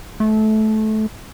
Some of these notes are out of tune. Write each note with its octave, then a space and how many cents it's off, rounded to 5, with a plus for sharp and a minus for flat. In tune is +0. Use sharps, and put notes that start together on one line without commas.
A3 -20